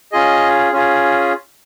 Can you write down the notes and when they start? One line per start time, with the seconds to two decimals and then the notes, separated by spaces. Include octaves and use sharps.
0.12 C#4 F4 G#4 D#5
0.72 C#4 F4 G#4